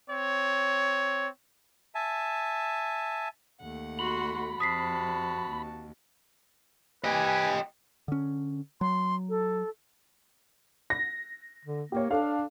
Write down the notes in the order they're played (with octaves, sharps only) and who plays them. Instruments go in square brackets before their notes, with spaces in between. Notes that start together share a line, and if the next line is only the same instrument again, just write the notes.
[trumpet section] C4 C#5
[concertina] E5 G#5 A5
[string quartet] D#2 A3 F#5
[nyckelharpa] F#4 C6 [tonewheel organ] B5
[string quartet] F2 C3 [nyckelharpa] F#4 A5 [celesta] D#6 B6 C7
[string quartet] D#2
[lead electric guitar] G4 D#5 [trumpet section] B4 G#5
[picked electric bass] D3 C#4
[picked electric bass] F#3 [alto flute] C6
[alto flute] A4
[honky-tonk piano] A#6
[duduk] D3
[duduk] A#3 [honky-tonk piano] G4 C#5
[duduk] D4 [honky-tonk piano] A4 F5